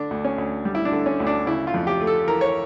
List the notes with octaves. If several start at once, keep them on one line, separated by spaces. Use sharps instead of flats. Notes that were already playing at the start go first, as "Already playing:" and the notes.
Already playing: D3 D4
D2
C#4
D2
G3
E4
D4
D3
C#4
D2
D4
C#3 E4
F4
F2
G4
A3
A4
E3 A#4
C#5